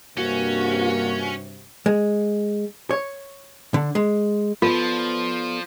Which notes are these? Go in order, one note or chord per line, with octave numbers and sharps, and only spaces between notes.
G2 C3 A#3 C#4 F#4
G#3
C#5
D3
G#3
F3 B3 F4 A4 D5